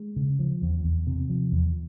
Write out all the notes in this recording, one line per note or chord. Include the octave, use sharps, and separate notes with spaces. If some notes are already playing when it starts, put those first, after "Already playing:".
Already playing: G#3
C#3
F3
E2
E2
C3
F3
E2